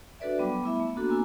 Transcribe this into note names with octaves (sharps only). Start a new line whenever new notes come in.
D4 F#4 A4 B4 D5 E5
F#3 G3 B3 B5 D6
A3 B3 E4 E5
A3
A#3 B3 D4 F#4 A4
A#3 C4 G#5 E6